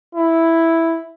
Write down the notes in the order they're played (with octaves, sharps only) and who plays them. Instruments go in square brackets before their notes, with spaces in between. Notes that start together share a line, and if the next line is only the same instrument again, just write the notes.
[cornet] E4